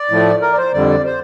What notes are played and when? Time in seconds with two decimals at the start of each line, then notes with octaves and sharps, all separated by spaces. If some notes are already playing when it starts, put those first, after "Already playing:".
Already playing: D5
0.10 A2 F3 A3
0.42 A#4
0.53 D5
0.58 C5
0.74 F2 D3 G3 D5
1.05 C5